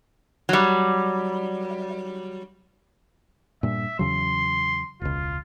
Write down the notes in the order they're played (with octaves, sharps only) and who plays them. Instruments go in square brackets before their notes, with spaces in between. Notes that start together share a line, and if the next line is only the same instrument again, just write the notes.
[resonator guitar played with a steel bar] F#3 G3
[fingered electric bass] G2 A#2 [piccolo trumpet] E5
[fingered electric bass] E2 C#3 F#3 [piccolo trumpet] C6
[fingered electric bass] E1 C#2 [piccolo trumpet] F4